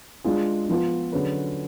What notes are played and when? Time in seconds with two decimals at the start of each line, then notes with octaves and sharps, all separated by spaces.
0.24 G#3 D4 F4 G#4
0.69 F3 B3 F4
1.12 D3 F#3 C#4 G#4 B4